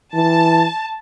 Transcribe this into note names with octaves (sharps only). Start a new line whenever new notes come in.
E3 A5